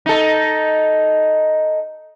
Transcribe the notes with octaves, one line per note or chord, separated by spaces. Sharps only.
D#4 A4